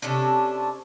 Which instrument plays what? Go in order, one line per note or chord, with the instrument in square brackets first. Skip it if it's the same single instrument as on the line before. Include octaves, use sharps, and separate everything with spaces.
[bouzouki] C3 C#4 D4 A4